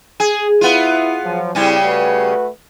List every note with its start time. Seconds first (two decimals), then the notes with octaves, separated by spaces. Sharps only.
0.20 G#4
0.61 B3 E4 F4
1.25 F3 F#3
1.55 C#3 G3 C4 C#4 E4
1.85 A3 F#4 B4